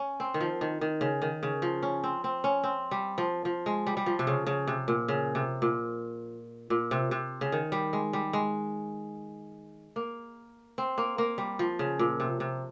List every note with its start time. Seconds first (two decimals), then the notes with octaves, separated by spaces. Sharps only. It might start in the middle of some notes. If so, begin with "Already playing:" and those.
Already playing: C#4
0.20 C4
0.34 D#3
0.41 F3
0.61 D#3
0.81 D#3
1.01 C#3
1.22 D#3
1.43 C#3
1.62 F3
1.83 C#4
2.04 C4
2.24 C4
2.44 C#4
2.64 C4
2.91 G3
3.18 F3
3.45 F3
3.66 G#3
3.87 G3
3.97 G3
4.06 F3
4.19 C3
4.27 C#3
4.46 C#3
4.67 C3
4.88 A#2
5.08 C#3
5.35 C3
5.62 A#2
6.70 A#2
6.91 C3
7.11 C3
7.41 C#3
7.52 D#3
7.72 G3
7.93 G#3
8.13 G3
8.33 G#3
9.96 A#3
10.78 C4
10.98 A#3
11.18 A#3
11.38 G3
11.59 F3
11.79 C#3
11.99 A#2
12.20 C3
12.40 C3